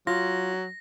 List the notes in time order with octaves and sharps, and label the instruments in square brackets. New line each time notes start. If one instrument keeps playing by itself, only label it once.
[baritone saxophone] F#3 [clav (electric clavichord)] F4 [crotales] A#6